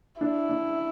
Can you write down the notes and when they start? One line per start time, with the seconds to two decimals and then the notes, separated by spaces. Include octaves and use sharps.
0.21 D4 E4
0.49 D4